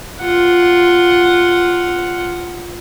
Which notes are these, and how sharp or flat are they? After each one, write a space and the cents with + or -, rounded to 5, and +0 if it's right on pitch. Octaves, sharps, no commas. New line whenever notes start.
F4 +0 F#5 +0